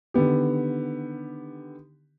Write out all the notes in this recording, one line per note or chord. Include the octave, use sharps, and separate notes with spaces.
D3 D#3 B3 G4